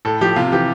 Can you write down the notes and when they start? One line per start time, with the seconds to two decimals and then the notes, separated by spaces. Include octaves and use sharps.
0.05 A2 A4
0.21 F3 G4
0.36 C3 F4
0.52 E3 G4